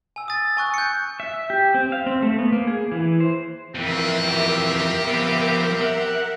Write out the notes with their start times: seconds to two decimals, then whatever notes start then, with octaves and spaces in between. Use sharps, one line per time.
0.16 G#5 E6
0.28 D#6 A6
0.57 G#5 C#6 F#6
0.74 G6 C#7
1.20 E5
1.50 G4
1.74 C4
1.92 F5
2.06 C4
2.23 A3
2.39 B3
2.52 A#3
2.67 G#4
2.92 E3
3.20 C5
3.75 F2 E3 C4 A#4 E5
4.26 G4
5.08 F3 B3
5.82 F#5